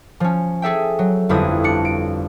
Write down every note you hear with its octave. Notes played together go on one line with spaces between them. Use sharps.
F3 C#4
G#4 A4 E5 G5
F#3
G1 F2 G3 E4 D#6
D4 C#7
D7